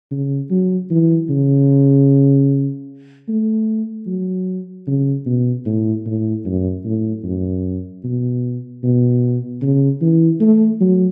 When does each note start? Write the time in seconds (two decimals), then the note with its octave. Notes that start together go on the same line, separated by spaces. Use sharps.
0.11 C#3
0.51 F#3
0.91 E3
1.30 C#3
3.29 A3
4.07 F#3
4.87 C#3
5.26 B2
5.66 A2
6.06 A2
6.45 F#2
6.85 A2
7.24 F#2
8.04 B2
8.83 B2
9.62 C#3
10.01 E3
10.41 A3
10.81 F#3